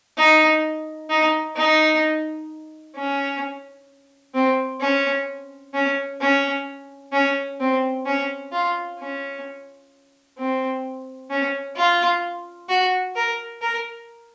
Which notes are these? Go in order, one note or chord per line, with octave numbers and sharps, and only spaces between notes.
D#4
D#4
D#4
C#4
C4
C#4
C#4
C#4
C#4
C4
C#4
F4
C#4
C4
C#4
F4
F#4
A#4
A#4